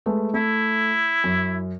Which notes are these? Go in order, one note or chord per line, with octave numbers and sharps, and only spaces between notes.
G#3 A3 B4
A3 E4
F#2